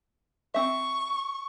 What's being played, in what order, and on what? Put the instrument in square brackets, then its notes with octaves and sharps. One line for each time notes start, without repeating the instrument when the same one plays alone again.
[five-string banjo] C4 E5 [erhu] C#6